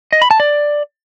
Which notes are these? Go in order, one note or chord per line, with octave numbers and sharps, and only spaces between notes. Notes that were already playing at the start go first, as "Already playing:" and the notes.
D#5
B5
A5
D5